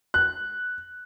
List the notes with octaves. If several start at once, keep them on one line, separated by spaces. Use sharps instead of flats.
F#6